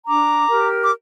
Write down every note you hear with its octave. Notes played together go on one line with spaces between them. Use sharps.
D4 A#5 D6
G4 A#4
D6